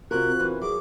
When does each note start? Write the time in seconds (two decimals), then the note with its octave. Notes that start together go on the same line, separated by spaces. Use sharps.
0.11 C3 F4 F#4 A#4 F#6
0.27 C4
0.40 E3 A#4
0.62 F#3 G#4 D6